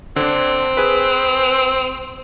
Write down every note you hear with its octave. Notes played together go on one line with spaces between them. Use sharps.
D3 C4 D4
G#4 B4